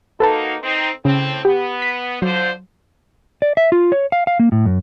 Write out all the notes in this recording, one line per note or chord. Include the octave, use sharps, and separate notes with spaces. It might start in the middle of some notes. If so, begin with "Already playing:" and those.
A#3 D#4 F#4 A4 B4 A5
C4 D#4
A2 C#3 C4
B3 G4
B6
D3 F3 F#3 C5
D5
E5
F4
C#5
F5
F5
A#3
A2
F#2